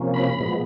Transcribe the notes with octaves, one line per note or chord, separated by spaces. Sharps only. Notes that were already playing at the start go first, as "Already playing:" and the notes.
Already playing: C3 F3 A#3 C#4
B5
A#2 F3 G#3 B3